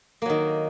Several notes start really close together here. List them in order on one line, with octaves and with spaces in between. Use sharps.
A#3 F#3 D#3